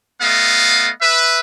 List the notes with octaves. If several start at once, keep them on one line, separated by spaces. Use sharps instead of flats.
A3 B3 D#5 F5
B4 E5